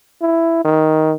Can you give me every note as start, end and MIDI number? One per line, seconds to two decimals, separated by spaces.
0.22 0.63 64
0.65 1.15 51